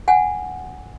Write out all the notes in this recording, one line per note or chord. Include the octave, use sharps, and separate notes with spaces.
F#5 G#5